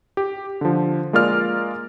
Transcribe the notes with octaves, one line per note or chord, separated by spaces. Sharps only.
G4
D3 F3
G#3 A#3 F4 A#4 D5 F6